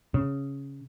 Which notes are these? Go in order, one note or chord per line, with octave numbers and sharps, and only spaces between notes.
C#3